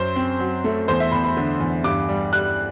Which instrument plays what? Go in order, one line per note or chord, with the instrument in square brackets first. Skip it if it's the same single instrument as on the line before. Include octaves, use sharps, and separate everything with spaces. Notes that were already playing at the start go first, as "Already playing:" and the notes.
Already playing: [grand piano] F#2 C5
C4
F#3
A3
E2 C5
E5
E2 B5
B5
D3
E2
G2 D6
G3
G3 F#6